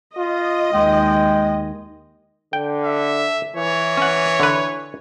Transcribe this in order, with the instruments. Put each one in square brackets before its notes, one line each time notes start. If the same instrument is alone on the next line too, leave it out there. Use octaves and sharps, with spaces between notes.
[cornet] F4 [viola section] D#5
[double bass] D#2 [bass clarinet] G#3 [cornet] G5
[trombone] D3 [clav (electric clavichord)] G5
[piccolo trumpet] E5
[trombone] E3 [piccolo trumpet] C#5
[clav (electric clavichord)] C#4 F#5
D3 B4